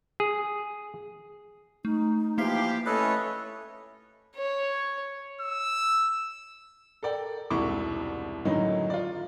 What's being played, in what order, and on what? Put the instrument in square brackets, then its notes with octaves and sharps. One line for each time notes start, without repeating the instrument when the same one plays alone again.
[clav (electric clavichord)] G#4
[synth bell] A3 [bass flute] D#4
[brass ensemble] E3 F3 G4 [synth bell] A#3 E5 B6 [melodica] F5 C6
[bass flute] A3 [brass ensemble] C#4 E4 C#5 [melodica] A4 B4 D#5 [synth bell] F#6
[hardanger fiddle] C#5
[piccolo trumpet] E6
[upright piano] A4 A#4 D5 G5
E1 C2 G#2 E4 C#6 D6
F#2 A2 D3 D#3 F#3 D#4
F4 D5